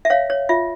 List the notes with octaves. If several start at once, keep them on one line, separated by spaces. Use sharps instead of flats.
E5
C#5 F5
C#5
F4 E5